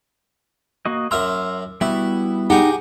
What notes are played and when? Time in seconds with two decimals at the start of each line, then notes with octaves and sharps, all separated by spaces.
0.86 A#3 F#4 D#5
1.11 F#2 E5 A#5 C6 E6 F6
1.81 G3 B3 E4 F#4
2.50 D#4 G4 G#4 F#5